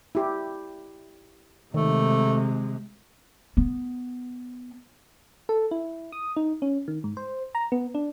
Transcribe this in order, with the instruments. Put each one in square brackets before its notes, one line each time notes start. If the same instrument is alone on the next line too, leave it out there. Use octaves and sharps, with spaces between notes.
[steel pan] E4 G4
[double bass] C3 G#3 [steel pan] D#3 [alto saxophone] A3
[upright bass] B3
[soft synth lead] A4
E4
D#6
D#4
C#4
D#3
G#2
C5
A#5
B3
D4